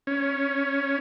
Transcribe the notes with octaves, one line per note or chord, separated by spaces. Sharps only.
C#4